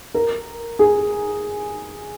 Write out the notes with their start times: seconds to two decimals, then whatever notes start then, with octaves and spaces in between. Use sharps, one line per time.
0.14 A#4
0.79 G#4